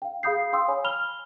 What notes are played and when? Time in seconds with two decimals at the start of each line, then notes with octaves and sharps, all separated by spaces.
0.02 F5 G5
0.23 G#4 F5 B5 D#6 G6 C7
0.53 F5 G5 C6 D#6 E6
0.68 C#5 G#5 B5
0.84 B5 F6 F7 G7